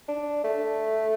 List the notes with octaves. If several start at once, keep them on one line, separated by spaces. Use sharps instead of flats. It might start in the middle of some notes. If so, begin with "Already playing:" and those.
D4
A3